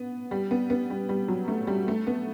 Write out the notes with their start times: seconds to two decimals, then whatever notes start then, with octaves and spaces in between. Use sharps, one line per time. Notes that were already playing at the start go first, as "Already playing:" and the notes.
Already playing: B3
0.31 G3
0.51 B3
0.70 B3
0.90 G3
1.09 G3
1.28 F#3
1.48 A3
1.67 G3
1.88 A3
2.07 B3